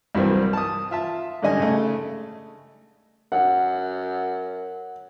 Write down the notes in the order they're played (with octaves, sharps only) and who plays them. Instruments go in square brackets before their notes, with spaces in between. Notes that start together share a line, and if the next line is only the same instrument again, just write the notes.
[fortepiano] C2 G2 E3 F#3 A#3 C4
A5 D#6
F4 E5 A5
G#2 D3 G3 C#4 D#5 G#5
C#3 A3
[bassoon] F#2 [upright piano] F#5